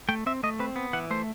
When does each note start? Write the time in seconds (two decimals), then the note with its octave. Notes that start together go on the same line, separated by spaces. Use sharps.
0.09 A3 G5
0.26 C4 E5
0.43 A3 D#5
0.59 C4 B4
0.76 B3
0.93 E3 F#5
1.10 A3 C5